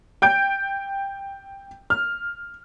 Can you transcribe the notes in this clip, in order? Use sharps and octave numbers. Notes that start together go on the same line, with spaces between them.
G5 G6 D7
F6